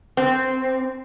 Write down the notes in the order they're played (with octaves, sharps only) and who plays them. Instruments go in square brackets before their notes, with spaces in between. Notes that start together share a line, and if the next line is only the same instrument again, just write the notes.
[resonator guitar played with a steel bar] C4